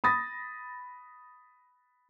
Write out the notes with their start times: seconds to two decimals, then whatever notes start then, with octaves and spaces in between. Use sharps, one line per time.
0.04 B5 D#6 A6 A#6